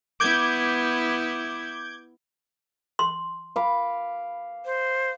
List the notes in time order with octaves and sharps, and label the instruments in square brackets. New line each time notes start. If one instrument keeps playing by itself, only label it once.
[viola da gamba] B3 E4 [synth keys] D6 G6 G#6
[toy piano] C6
[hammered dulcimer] F5 B5 D6
[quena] C5